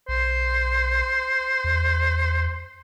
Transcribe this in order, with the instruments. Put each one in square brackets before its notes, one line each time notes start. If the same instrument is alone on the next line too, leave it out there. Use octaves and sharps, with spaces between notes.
[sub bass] B1 [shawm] C5
[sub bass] E2